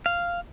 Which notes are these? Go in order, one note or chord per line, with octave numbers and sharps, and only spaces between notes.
F5